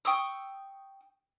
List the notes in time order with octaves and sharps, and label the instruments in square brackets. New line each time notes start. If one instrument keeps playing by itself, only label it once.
[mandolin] G5 C#6 D#6 E6